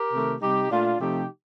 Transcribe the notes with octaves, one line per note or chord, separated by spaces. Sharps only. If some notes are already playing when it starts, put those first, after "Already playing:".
Already playing: G4 A#4
C3 D#3 A3
C3 G3 D#4 G4
A#2 A3 D4 F4
C3 F3 A3 D#4 G4